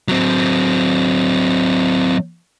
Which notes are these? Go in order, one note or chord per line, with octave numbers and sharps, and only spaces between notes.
F#3 C4